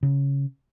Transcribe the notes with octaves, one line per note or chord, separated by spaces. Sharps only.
C#3